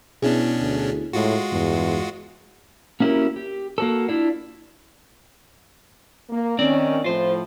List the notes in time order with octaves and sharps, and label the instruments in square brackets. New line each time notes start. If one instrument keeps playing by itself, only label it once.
[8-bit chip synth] B2 C#4 D4 [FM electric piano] B3 E4 G#4
[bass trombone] D2
[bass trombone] A2 [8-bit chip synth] G#3 F4 F#4
[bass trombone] E2 [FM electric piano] G2
[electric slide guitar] A#3 C#4 E4 F#4 G4 A#4
G4
A#3 F#4 A4
D4 E4 F4
[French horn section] A#3
[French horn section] D#3 C#4 [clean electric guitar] C4 D5
[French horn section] A2 F3 [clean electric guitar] F4 C5